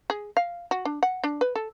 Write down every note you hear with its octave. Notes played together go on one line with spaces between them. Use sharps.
G#4
F5
F#4
D4
F#5
D4
B4
A4